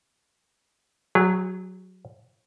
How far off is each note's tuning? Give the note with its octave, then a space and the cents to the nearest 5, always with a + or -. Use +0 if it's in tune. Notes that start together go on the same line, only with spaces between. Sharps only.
F#3 +0 G#4 -40